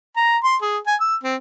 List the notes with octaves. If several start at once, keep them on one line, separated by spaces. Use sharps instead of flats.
A#5
C6
G#4
G#5
E6
C4